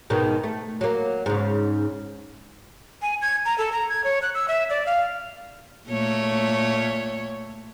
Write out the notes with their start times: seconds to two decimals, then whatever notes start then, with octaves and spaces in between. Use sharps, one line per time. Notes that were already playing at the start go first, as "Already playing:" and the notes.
0.10 G#2 B2 D#3
0.44 A3
0.81 F#3 A#3
1.26 G#2 C#3
3.02 G#5
3.22 G#6
3.45 A#5
3.58 A4
3.72 A#5
3.89 G#6
4.04 C#5
4.22 F#6
4.35 E6
4.48 E5
4.70 D5
4.86 F5
5.88 A#2 A3 C#5